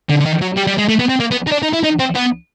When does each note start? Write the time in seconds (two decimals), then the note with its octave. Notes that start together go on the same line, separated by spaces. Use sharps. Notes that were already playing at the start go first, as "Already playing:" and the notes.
0.09 D3
0.20 D3
0.25 D#3
0.42 F#3
0.57 G3
0.67 G3
0.78 G#3
0.89 A3
0.99 B3
1.09 C4
1.20 A#3
1.31 B3
1.47 D#4
1.52 D4
1.63 D#4
1.73 E4
1.83 D#4
1.99 C4
2.15 B3